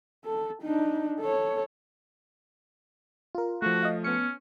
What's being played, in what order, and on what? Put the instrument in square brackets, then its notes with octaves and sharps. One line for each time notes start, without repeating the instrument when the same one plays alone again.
[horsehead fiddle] A4
D4 D#4
A4 C#5
[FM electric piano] F4 A#4
[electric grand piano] F3 A3 [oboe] F#4
[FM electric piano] D#5 F5
[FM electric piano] B3 C#7 [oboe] C#4